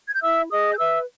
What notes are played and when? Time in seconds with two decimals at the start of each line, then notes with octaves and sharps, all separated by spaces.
0.08 G#6
0.15 G6
0.22 E4 E5 E6
0.51 G#4 D#5 D#6
0.73 G6
0.79 B4 E5 E6